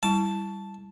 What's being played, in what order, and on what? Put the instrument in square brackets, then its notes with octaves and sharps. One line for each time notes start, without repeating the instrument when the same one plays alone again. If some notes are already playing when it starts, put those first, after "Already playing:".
[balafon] G3 E4 [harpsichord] A5